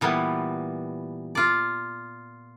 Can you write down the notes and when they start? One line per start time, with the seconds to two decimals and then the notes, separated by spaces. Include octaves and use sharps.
0.01 A#2 E3 G3 B3
1.35 F4 D5